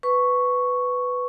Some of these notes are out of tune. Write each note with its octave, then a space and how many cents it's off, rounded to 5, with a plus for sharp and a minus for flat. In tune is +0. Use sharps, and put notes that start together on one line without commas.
B4 +10 C#6 +0